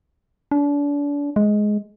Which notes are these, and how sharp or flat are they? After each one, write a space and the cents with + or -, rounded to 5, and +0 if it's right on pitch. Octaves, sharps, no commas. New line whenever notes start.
D4 -35
G#3 +10